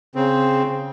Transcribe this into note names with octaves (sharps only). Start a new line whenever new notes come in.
C#3 C4